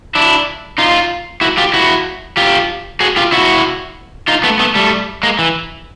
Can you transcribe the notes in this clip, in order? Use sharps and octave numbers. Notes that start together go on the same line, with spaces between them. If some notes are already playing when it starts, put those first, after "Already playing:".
D4 E4
D#4 F4
E4 F#4
F4 G4
E4 F#4
F4 G4
F#4 G#4
F4 G4
E4 F#4
D#4 F4
A3 B3
A3 B3
G3 A3
G#3 A#3
E3